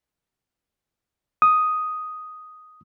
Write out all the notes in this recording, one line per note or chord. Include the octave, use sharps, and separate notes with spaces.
D#6